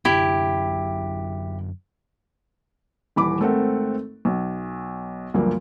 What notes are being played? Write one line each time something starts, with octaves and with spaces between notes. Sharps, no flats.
F#2 D3 F#3 E4 G4
D#1 E3 B5 D6
G#1 A3 C4 A4 A#4 F#5
B1
D2 G2 F3 F#3 A3 A#3